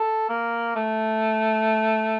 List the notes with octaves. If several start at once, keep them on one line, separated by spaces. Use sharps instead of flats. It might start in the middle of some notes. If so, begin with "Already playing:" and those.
Already playing: A4
A#3
A3